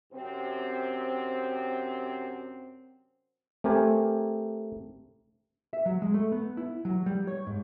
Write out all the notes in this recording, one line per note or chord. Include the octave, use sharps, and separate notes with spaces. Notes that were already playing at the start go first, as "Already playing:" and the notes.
F#2 C3 C4
A3 C4 G4 A#4 G#5
E5
F#3
G#3
A3
B3
E4
F#3
G3
C#5
G#2